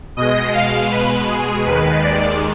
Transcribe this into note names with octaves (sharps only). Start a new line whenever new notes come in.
B2 G#3 D#5
F5
B4
G#4
D#2 D#3 G#3 B4
D5